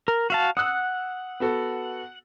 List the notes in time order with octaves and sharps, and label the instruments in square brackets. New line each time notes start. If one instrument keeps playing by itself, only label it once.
[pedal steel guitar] A#4
F#4 F5 A5
[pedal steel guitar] F#5 [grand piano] D#6 E6 F#6
[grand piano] B3 F#4 A4